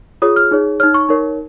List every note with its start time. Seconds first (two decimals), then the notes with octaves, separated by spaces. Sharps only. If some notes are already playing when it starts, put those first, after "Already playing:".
0.22 F4 G#4 C#5 D#6
0.36 F6
0.51 D#4 G#4 C#5
0.80 C#5 F6
0.83 D#4
0.94 C#6
1.09 D#4 A#4 C#5